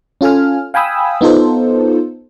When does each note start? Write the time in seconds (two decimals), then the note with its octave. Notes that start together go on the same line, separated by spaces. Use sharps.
0.21 C#4 F4 A4 G#5 F6
0.74 F5 G5 G#5 B5 D#6 E6
1.21 B3 D#4 F4 A4 C5